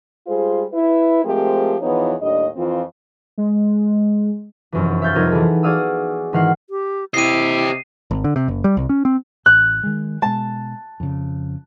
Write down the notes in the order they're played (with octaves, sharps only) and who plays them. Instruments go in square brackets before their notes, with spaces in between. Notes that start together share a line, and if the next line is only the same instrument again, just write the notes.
[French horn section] G3 G#3 F4 G#4 C5
E4 B4
F3 G#3 A3 C4 G4 A#4
E2 E3 F3 B3 D#4 C#5
D#2 A2 G3 D4 D#5
F2 E3 C4 F4
[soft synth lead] G#3
[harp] F1 F#2 E3
E5 F5 C#6 G6 A6
C2 F2 C3 D#4 A#4 G#6
E3 B3 G#4 A4
F#4 G#4 D5 F5 D#6 E6
G#1 D#3 E3 F5 F#5 C7
[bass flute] G4
[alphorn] C3 [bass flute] E4 [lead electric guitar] G4 D#5 [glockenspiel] C7 D#7
[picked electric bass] G#1
D3
C3
F#1
G3
C2
C#4
C4
[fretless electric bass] A1 [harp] F#6
[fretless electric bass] D#3 G#3
[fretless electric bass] B2 G#3 [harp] A5
[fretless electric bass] F2 C#3